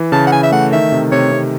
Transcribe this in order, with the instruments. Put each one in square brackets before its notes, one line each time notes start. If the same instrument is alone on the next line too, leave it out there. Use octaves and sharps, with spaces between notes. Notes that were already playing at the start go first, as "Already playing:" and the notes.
Already playing: [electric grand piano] E3
[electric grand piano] C#3 [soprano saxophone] A5
[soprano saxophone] F#5
[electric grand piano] E3 [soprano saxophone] G#5
[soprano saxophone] E5
[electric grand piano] A3 [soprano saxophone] F#5
[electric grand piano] D#3 [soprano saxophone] E5
[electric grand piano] C3
[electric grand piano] C3 [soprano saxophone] C#5
[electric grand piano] C3